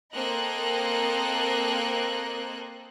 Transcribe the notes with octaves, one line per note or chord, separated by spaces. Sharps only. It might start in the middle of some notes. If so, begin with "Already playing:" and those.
A#3 C4 A4 A#4 D#5 F#6